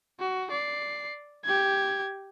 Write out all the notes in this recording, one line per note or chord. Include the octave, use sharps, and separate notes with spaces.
F#4
D5 C7
G4 G#6